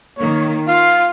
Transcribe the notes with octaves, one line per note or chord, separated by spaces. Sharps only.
D#3 A#3 C#5
F4 F5